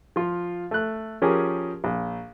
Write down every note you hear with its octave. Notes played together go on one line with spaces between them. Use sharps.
F3 F4
A3 F#6
F3 C#4 G4 G#4 A#4
A#1